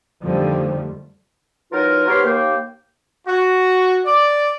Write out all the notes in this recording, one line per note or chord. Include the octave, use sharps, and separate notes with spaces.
F2 D3 D#3 F3 G3 A3
E3 F#3 D#4 F4 A#4
G#2 B3 G4 C#5 C6 F6
D#2 A#3 G5
F#4
D5